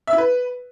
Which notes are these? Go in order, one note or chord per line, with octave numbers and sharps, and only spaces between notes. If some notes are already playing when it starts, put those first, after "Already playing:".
E5
E4
B4